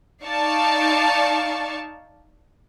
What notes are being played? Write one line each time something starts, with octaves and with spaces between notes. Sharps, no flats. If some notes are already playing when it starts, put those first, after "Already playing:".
D#4 D5 F5 A5 C#6